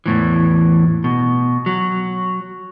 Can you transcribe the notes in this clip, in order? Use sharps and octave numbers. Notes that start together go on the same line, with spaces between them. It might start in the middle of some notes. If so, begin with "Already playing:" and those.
E2 A2 E3
B2
F#3